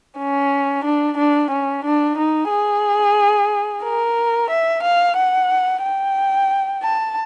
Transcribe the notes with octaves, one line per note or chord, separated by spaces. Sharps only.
C#4
D4
D4
C#4
D4
D#4
G#4
A#4
E5
F5
F#5
G5
A5